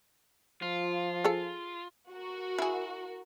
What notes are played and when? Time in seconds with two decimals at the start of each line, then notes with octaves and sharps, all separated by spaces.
0.62 F3 F4
1.24 G#4 A4
2.12 F#4 A#4
2.58 E4 G#4